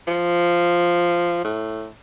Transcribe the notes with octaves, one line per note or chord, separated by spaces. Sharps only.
F3
A2